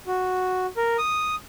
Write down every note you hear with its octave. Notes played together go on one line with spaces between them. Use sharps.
F#4
A#4
D#6